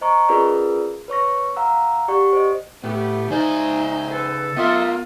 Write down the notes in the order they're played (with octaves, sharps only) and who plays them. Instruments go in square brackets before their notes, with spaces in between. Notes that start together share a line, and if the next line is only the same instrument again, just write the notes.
[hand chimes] C5 D#5 A#5 C#6
C#4 F4 G#4 A#4 B4 D5
B4 C#5 C#6 A#6
F5 F#5 A#5 E6
G4 D5 F#5 C#6
C5 D#5
[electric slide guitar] A2 [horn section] A3 B3 G4
[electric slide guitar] C#3 D5 E5 [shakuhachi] D#4 [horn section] C5 G#5
[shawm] A4 [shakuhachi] B4
[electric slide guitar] B3 A#4 [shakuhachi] F4 [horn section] D#5 E5 C6